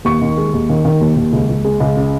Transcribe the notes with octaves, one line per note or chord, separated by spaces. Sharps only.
D#2 C#6
D#3
G#3
D#2
D#3
D#3
D#2
D#2
C#2
C#2
G#3
C#2
C#3